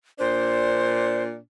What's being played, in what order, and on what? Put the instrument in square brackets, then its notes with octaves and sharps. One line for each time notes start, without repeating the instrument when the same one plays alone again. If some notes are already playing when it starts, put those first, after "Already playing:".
[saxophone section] A#2 D4 [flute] C5